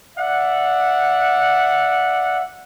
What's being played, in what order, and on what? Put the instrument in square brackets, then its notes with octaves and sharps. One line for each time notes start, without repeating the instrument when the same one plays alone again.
[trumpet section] D5 E5 F#5